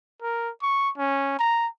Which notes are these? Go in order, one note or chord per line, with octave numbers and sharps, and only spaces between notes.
A#4
C#6
C#4
A#5